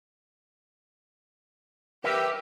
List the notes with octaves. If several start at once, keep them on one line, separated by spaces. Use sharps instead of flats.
G4 A#4 B4 E5